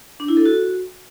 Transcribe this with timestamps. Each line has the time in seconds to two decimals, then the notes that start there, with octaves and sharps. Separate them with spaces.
0.20 D4
0.28 E4
0.37 A4
0.45 F#4